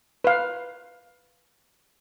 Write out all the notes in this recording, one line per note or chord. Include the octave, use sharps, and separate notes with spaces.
B4 F5